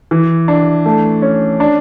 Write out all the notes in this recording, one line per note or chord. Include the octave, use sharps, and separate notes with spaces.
E3
D4
A3
C#4
D4